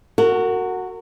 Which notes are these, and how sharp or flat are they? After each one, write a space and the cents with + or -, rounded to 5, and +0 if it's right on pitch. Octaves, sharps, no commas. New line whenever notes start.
F#4 +0 A#4 -35